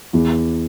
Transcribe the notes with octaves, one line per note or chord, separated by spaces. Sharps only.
E2